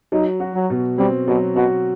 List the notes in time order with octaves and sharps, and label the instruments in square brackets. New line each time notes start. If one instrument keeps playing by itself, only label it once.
[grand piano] F#3 [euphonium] D#4
[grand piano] F#4
[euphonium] F#3
[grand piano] B2
[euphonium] G3 [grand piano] C4
[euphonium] B2 [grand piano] F#3
[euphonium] B2 [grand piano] F#4